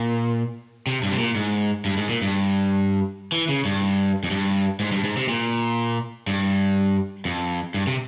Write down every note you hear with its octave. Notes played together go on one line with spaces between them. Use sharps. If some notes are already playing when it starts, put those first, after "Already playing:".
Already playing: A#2
C3
G2
C3
A#2
G#2
G2
G#2
A#2
G2
E3
C#3
G2
F2
G2
G#2
G2
G#2
C3
A#2
G2
F2
G2
C3